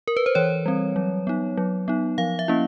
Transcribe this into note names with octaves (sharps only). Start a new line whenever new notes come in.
A#4
B4
C5
E3 C#5
G3 C4
F#3
B3 D#4
F#3
B3 D#4
F3 F5
E5
A#3 C#4 E4